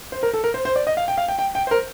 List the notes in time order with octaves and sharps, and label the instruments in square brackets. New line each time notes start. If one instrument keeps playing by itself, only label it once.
[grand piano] C5
A#4
A4
A#4
C5
C5
D5
D#5
F5
G5
F5
G5
G5
G5
C5
A#4